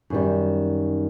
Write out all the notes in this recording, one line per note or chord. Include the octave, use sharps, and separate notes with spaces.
F#2 D#3 G3